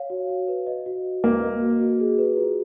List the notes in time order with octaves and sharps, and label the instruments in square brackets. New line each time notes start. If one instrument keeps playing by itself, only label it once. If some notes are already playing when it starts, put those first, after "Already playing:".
Already playing: [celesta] C#5 F5
F#4
F#4
B4
D#5
F#4
F#4
[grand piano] A#3 [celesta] B4
[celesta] D#5
F#4
F#4
G#4
B4
F4